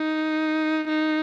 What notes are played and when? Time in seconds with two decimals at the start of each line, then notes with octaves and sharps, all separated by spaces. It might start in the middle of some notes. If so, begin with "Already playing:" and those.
Already playing: D#4
0.89 D#4